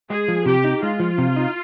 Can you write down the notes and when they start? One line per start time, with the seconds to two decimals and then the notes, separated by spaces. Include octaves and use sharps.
0.10 G#3 G#4
0.28 F3
0.46 C3 G4
0.64 D#4
0.82 G#3 F4
1.00 F3
1.18 C3
1.36 D#4